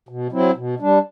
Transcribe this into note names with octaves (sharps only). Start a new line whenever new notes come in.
B2
F#3 C4 E4
B2
G3 D4